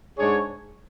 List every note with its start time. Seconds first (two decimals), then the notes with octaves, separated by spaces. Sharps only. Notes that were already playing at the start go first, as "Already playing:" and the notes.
0.18 G#2 G#3 D4 G#4 C#5